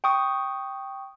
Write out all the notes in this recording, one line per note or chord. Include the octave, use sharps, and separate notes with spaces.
G5 C#6 D#6